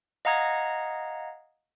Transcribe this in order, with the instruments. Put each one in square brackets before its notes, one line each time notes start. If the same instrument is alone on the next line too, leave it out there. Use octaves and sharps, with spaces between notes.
[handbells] D#5 F5 F#5 A#5 D#6 G#6